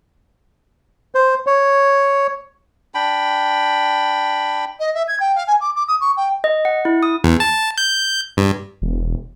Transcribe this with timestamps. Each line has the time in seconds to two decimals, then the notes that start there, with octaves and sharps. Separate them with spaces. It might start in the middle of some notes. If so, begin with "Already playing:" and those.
1.15 C5
1.47 C#5
2.94 D4 G5 B5
4.79 D#5
4.94 E5
5.07 G#6
5.19 G5
5.35 F5
5.47 G#5
5.60 D6
5.75 D6
5.87 D#6
6.00 C#6
6.16 G5
6.44 D#5
6.65 F#5
6.85 E4
7.03 D#6
7.24 E2
7.40 A5
7.78 G6
8.37 G2
8.82 E1